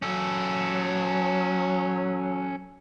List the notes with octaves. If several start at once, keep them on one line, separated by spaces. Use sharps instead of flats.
F#3 C#4 A4